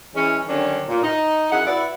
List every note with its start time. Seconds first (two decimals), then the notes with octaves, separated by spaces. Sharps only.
0.15 E3 G#3 C#4
0.47 D3 D#3 F#3 G3 C#4 D4
0.88 A#2
1.02 D#4
1.52 F#2 E4 G#4 F#5
1.66 E4 F#4 B4 D5 E5 F#5